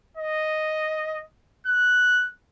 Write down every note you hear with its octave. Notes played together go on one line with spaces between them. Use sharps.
D#5
F#6